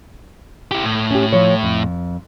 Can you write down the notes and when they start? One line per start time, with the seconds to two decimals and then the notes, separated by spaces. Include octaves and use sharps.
0.71 E4 G4
0.84 A2
1.11 C#4 G4
1.33 F3 C#5
1.63 F2